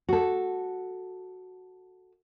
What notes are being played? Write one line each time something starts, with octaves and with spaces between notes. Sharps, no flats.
F#4 A4